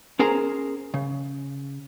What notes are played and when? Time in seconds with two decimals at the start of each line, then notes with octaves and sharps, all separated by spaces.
0.19 C#4 G#4 A#4 C5 G#5 A#5
0.94 C#3